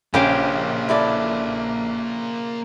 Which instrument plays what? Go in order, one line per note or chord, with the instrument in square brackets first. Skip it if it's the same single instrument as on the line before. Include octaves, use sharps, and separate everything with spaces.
[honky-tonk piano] A#1 [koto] C#3 G4 F5 [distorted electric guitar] A#3 C5 [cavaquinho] G#5
[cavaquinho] E4 A4 D5